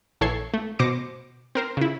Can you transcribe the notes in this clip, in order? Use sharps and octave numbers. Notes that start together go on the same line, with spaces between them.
A#1 E3 A4 C#5 G#6 C7
A3
B2 C5 D6 A#6 C#7
C4 A#4 C5
C#3 E4